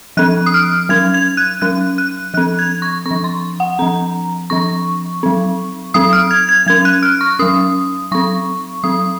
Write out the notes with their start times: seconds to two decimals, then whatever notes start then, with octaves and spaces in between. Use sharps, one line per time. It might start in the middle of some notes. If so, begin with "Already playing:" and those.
0.17 F3 C4 F#6
0.46 D#6
0.54 F6
0.89 F#3 C#4 G#6
1.14 G#6
1.37 F#6
1.62 F#3 C#4 F#6
1.98 F#6
2.34 F3 C4 F#6
2.59 G#6
2.82 C#6
3.06 C4 C#6
3.11 F3
3.24 C6
3.60 F#5
3.79 F3 C4 A#5
4.50 F3 C4 C#6
5.23 F#3 C4
5.94 F#3 C4 D#6
6.13 F6
6.31 G#6
6.49 G#6
6.66 F#3 C#4 G#6
6.85 F#6
7.03 F6
7.21 C#6
7.39 F#3 C#4 D#6
8.11 F#3 C4 C#6
8.83 F#3 C4 D#6